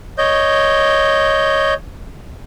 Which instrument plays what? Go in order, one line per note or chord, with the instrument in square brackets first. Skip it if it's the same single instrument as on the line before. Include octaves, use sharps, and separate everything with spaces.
[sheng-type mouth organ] C#5 D#5 G6